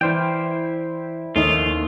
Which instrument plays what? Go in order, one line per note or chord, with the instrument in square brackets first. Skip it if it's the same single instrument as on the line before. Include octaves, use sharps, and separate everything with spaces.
[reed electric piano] E3 D5 F6 [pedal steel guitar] E4 C5 G5
[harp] D#2 [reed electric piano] A3 C#4 D#4 [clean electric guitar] F4